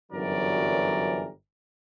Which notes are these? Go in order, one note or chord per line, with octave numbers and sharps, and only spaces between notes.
G1 F#2 E3 F#3 A#4 D5